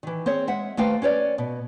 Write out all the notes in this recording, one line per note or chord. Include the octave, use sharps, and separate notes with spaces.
D#3 E3
C4 G#4 C5 C#5
G#3 E5 F#5
D#2 A3 B4 C5 F5 G5
C#4 B4 C#5 D5
B2